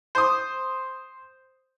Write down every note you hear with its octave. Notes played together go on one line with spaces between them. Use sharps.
C5 D#6